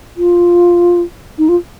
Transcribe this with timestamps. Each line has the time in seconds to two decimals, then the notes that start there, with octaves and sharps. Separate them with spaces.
0.17 F4
1.38 D#4
1.49 F4